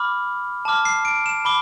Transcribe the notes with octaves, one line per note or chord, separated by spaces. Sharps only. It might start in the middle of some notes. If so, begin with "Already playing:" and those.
Already playing: B5 D6 F6
A5 D6 F6
C7
D7
E7
B5 D6 G7